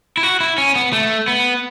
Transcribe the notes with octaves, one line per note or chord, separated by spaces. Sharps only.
E4
F#4
E4
C#4
B3
A3
B3